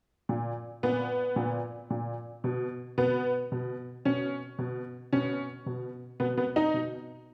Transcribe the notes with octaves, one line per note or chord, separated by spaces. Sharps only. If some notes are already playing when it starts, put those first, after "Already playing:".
A#2
A#2 B3
A#2
A#2
B2
B2 B3
B2
B2 C#4
B2
B2 C#4
B2
B2 B3
B3
D#4
B2